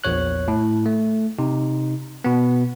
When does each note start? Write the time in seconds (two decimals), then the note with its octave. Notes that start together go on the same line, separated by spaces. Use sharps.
0.04 A#1 E2 C#5 F#6
0.48 A2
0.86 A3
1.39 C3 D#4
2.24 B2 B3